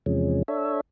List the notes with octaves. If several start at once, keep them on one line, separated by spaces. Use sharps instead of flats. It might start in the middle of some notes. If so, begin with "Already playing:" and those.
E2 C3 F3 G#3 C#4
D4 A4 C#5 E5